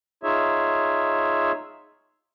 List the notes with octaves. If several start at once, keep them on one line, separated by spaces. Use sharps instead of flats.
D#4 F4 G#4 C#5 E5